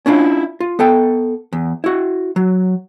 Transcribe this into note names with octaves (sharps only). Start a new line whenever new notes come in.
C#4 D4 E4 F4
F4
B3 A4 G5
E2
E4 F#4
F#3